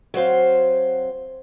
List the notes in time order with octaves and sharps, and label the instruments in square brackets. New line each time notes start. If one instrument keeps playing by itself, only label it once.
[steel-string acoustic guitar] F#3 C4 C5 F5